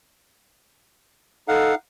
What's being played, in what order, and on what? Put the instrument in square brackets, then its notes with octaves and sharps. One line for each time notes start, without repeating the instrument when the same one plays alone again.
[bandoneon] D#4 F5 F#5 [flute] A4